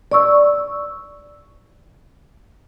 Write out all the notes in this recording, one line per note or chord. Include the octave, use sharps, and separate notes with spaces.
D5 C#6 E6